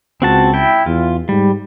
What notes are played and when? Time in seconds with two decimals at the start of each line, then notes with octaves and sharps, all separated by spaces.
0.22 C#2 C4 F#4 A5
0.54 E4 G5
0.86 E2 F4
1.29 G#2 G3